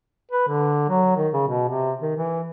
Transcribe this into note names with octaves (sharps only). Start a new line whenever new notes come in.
B4
D3
F#3
D#3
C#3
B2
C3
D#3
E3